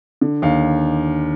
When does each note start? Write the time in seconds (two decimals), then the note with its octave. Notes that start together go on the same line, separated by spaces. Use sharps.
0.21 D3
0.42 D#2 F5